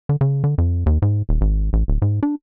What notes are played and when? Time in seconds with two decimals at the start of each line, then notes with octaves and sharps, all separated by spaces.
0.09 D3
0.21 C#3
0.44 D3
0.58 F2
0.86 D#2
1.02 G#2
1.29 D#1
1.41 G#1
1.73 A1
1.88 D1
2.02 G#2
2.23 D4